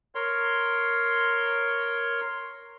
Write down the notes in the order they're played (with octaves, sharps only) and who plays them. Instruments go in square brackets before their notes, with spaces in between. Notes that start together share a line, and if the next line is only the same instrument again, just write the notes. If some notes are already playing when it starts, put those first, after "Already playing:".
[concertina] A#4 C#5 C6